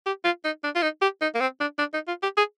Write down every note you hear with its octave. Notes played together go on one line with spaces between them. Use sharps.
G4
F4
D#4
D4
F4
D#4
G4
D#4
A#3
C4
D4
D4
D#4
F4
G4
G#4